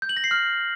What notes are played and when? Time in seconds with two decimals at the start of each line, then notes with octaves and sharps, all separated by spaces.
0.02 G6
0.09 F#7
0.17 A#6
0.24 C7
0.31 F6